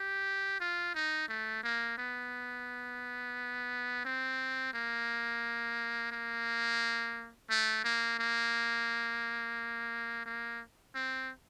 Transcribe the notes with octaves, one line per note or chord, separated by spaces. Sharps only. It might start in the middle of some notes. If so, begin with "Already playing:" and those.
Already playing: G4
F4
D#4
A3
A#3
B3
C4
A#3
A#3
A3
A#3
A#3
A#3
C4